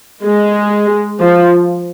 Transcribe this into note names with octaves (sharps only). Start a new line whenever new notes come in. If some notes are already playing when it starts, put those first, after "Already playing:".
G#3
F3